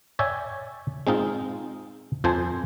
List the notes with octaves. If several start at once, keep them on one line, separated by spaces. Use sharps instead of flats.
C#5 D5 E5 G5 G#5
G#3 C4 D#4 F4
F2 F3 C5 G#5 A5